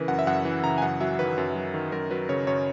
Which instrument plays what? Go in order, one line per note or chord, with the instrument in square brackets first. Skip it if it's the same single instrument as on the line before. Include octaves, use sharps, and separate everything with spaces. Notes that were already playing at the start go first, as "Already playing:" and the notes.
Already playing: [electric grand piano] C#3 E3 A#4 B4
F#2 F#5
E5
F#2 F#5
E3
C#3 A#5
G#5
F#2 F#5
F#3 E5
D#3 B4
F#2
F#3
D#3
F#2 A#4
F#3 B4
C#3 C#5
F#2 C#5